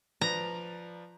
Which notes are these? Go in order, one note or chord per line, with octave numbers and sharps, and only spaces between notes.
F3 B4 D5 A#5